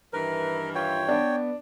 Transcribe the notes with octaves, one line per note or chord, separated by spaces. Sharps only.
G2 D#3 E3 A#4 B4
F4 C#5 G5
B3 D4